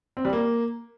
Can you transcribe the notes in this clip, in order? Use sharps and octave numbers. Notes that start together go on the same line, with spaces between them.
C4
G3
A#3